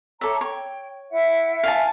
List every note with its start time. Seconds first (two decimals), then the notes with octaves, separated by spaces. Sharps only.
0.21 A4 C#5 E5 A#5 D6
0.41 C#5 G5
1.11 E4 E5 F#5
1.64 F5 G#5 A5